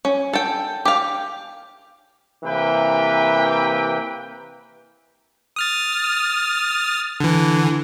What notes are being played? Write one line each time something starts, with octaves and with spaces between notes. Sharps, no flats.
C#4
A4 G5
G4 F5
C3 E3 A#3 B4 G5
D#6 F6 A6
D3 E3